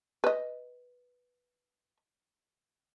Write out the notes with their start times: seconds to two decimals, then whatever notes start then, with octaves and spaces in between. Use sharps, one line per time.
0.24 B4 D#5